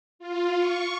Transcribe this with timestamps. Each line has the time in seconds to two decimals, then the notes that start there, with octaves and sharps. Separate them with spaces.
0.19 F4
0.56 C#6